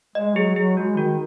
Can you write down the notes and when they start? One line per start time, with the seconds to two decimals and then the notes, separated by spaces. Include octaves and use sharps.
0.15 G#3 D#5
0.36 F#3 G#4
0.56 F#3 G#4
0.77 G#3 F#4
0.97 D#3 F#4